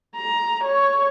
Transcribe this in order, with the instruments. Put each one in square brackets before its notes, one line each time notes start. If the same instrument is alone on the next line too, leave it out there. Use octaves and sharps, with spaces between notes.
[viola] A#5
C#5